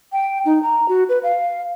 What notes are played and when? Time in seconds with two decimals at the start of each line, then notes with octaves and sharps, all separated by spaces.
0.12 G5
0.45 D#4
0.62 A#5
0.88 F#4
1.09 B4
1.23 F5